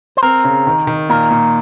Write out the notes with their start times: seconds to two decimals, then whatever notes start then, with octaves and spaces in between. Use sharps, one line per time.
0.17 C5
0.23 C4 A#4
0.44 C#3
0.67 D#3
0.87 D#3
1.10 A#2 A#4
1.31 A#2